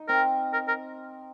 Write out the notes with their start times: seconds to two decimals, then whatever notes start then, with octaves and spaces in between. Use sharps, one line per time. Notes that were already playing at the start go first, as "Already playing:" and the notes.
Already playing: D#4
0.09 C4 A#4
0.53 A#4
0.68 A#4